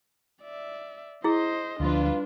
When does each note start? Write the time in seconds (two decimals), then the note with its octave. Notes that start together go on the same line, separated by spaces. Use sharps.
0.43 D5 E5
1.24 E4 G#4 C5 D#5
1.80 D2 F3 G3 D4 F4 B4